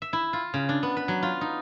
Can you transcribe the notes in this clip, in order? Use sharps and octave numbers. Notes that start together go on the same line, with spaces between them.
E5
E4
F4
C#3
D4
B3
B4
F#3
F4
D#4